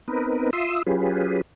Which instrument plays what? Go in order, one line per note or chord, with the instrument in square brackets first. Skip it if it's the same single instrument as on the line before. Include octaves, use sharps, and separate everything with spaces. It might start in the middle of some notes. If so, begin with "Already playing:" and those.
[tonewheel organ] B3 C4 D#4 A#4 B4
F4 E5 C6 D#6 E6
F#3 C#4 F4 G4 G#4 B4